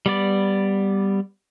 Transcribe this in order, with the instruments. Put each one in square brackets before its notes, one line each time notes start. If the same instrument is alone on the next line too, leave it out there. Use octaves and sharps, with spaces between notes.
[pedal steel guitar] G3 B3 D5